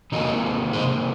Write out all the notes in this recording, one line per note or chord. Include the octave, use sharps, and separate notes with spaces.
C3 D#3 A#3 D#4 F#4
G#4 C5